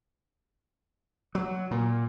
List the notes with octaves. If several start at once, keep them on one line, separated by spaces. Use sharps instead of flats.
F#3
A#2